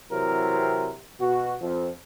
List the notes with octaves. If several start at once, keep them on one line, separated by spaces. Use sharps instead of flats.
C3 E3 F#3 C4 E4 A#4
B2 F#4
F2